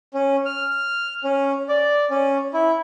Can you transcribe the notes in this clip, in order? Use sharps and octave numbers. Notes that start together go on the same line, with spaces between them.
C#4
F6
C#4
D5
C#4
E4